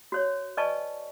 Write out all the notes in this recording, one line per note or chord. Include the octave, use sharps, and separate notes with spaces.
F#4 C5 C#5
B4 D5 D#5 G#5 A5 C#6